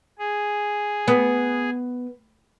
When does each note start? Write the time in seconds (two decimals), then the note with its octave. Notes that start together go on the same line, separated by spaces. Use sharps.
0.19 G#4
1.08 B3